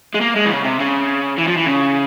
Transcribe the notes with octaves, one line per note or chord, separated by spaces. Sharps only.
G#3
A#3
G#3
E3
C#3
C3
C#3
E3
F3
E3
C#3